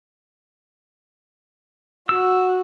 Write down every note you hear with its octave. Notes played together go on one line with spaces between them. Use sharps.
F#4 E6